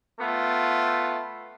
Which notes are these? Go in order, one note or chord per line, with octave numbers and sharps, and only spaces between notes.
A3 B3 F4